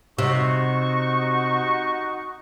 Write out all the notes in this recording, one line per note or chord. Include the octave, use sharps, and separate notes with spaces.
C3 D#4 F#4 C#6